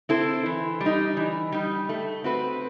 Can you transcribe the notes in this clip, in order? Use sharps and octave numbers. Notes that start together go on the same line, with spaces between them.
C4 E4 A4 C5
E3
G3
D#4
E3
G3 D#4
A3
C4 F#4 B4